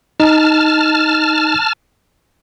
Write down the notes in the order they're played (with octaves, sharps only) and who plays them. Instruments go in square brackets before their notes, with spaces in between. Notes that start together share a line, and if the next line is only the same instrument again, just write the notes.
[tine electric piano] D#4 [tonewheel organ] A5 F6